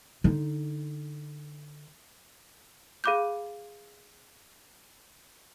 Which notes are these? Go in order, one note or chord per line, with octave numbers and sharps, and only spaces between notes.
D3 D#4
G#4 F5 B5 D6 F#6 G6